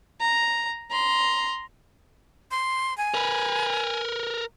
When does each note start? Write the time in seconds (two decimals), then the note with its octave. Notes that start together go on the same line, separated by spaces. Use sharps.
0.20 A#5
0.91 A#5 C6
2.51 C6
2.98 G#5
3.14 A#4 B4